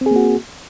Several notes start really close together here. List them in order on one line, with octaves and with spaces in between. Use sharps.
C4 G#4 A#3 F#4